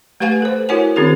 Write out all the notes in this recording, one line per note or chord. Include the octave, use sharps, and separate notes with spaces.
A3 G4 B4 F5 F#5 G#5
A4 C5
E4 F#4 A#4 C#5 F#5 G#5
D#3 C4 C#4 F#4 G#4 A#4